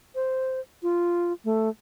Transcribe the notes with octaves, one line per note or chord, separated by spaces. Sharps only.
C5
F4
A3